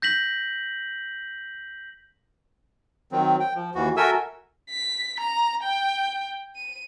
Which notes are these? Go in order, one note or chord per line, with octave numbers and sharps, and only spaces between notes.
G6 A#6 B6 F#7
D#3 F#3 C4
G5
F3
D#2 E3 F#4
F#4 A4 A#4 E5 G#5 E6
B6
A#5
G5
D#7